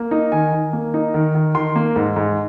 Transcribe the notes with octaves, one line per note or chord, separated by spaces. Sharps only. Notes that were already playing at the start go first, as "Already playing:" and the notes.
Already playing: A#3
D#4
D#3 G#5
D#3
A#3
D#4
D#3
D#3
D#3 C6
A#3
G#2
G#2